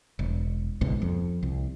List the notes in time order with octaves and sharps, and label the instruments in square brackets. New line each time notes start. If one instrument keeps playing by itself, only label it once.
[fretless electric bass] E1
G#1 C#2 G#2 B2
F2
C2